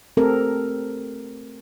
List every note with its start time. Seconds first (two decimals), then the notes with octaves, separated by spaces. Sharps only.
0.17 A3 C4 G4 A4 A#4